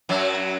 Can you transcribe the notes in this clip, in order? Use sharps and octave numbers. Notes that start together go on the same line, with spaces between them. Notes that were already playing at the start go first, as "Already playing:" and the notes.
F#2 F#3